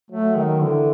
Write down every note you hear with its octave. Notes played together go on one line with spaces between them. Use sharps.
F#3 A3
D#3
D3 E3